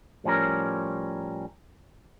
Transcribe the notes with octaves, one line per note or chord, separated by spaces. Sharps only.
A2 F3 G3 C#4 A#4